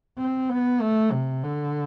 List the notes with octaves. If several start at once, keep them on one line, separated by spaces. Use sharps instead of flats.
C4
B3
A3
C3
D3